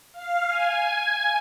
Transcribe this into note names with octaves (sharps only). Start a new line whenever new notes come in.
F5
G#5